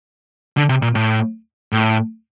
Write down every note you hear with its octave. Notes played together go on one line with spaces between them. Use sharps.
D3
C3
A#2
A2
A2